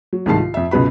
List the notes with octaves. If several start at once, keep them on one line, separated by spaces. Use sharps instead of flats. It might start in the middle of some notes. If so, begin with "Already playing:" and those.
F#3
C2 G#2 D#3 G#3 A5 C7
F4
F2 E5
C#2 F#2 B2 B4 B5